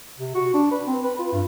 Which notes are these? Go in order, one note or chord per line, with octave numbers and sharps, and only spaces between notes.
C3
F#4
D4
B4
C4
B4
F4
G2